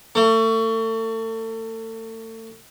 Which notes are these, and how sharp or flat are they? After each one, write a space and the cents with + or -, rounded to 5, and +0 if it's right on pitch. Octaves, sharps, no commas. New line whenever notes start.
A3 +35